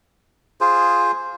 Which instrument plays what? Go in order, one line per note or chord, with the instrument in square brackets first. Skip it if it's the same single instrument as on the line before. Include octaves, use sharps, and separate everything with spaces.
[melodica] F4 G#4 C5